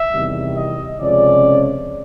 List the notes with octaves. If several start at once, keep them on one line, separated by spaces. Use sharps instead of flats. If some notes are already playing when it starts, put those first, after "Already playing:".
Already playing: E5
E2 C3 D#3 G3
D#5
C#2 C3 F3 G#3 C#4 D5